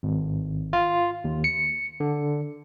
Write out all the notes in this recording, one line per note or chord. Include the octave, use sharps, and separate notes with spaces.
G#1
F4
D#2
C#7
D3